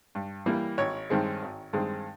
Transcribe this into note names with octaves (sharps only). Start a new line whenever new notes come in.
G2
E3 G3 A#3
G#1 C#5
G2 D#3 G#3 C4
G#1
G2 D#3 G#3 C4